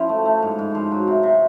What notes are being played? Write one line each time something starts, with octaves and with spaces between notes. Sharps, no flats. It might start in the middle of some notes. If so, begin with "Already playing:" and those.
Already playing: F3 C#4 E4
A3
A3
G#2
G#2
F3
F#3
C3
C3